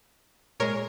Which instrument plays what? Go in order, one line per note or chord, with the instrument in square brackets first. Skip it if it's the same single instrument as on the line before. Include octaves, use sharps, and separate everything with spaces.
[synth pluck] A#2 G#3 A#4 C#5